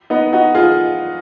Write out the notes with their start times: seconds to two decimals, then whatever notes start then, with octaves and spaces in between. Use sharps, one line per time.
0.10 B3 D#4
0.33 D#4 F#4
0.55 F4 G#4